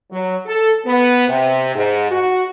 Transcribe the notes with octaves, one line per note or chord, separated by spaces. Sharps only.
F#3
A4
B3
C3
G#2
F#4